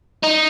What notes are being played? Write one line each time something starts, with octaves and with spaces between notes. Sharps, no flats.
D#4